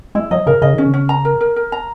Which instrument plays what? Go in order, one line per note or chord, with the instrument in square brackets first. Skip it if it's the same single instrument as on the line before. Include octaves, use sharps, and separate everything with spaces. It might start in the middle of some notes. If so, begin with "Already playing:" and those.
[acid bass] G#3 [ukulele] E4
[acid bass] F#3 [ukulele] D#5
[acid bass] C#3 [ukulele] A#4
[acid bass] C#3 [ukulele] D#5
[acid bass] D#3 [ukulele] C#4
[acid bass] C#3
[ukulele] C#4
A#5
A#4
A#4
A#4
A#5